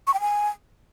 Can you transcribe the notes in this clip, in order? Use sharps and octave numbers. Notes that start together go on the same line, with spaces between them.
C#6
G5
G#5